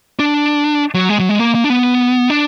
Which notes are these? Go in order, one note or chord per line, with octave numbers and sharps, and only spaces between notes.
D4
F#3
G#3
F#3
G#3
A#3
A#3
D4
B3
D4